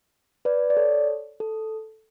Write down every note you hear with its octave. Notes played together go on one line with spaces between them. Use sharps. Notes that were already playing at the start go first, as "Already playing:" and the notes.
B4 D5
D5
A4 C#5
A4